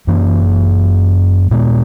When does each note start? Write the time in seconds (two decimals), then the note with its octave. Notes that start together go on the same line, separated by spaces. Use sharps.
0.07 F#2 E3 A#3 C#4
1.51 A#2 G#3 B3